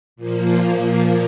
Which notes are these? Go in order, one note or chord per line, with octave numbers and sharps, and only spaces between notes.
A#2 F3 A#3